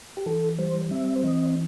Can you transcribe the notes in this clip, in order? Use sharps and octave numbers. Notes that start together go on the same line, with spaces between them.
G4
E3 A4
G3 C5
C4 E5
C5
E3 D#5